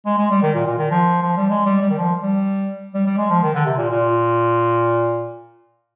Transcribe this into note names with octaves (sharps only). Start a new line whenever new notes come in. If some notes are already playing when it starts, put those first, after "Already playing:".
G#3
G#3
G3
D#3
A#2
A#2
D#3
F3
F3
G3
G#3
G3
G3
D#3
F3
G3
G3
G3
G#3
F3
D#3
D3
C3
A#2
A#2